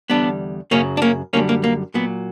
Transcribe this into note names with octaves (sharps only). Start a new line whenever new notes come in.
E2 D3 G3 B3 D4
F#2 C#3 F#3 A#3 C#4
D4
A#3 C#4
F#2 D3 G3 A#3 C#4
A#3
A#3
A#2 F#3 B3